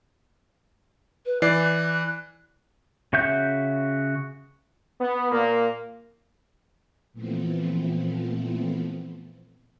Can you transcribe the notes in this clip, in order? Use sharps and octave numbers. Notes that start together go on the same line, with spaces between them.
B4
E3 D5 F#6 C7
C#3 F#4 E5 G6
B3
A#2 A#3
A#2 E3 F3 A3 B3 C4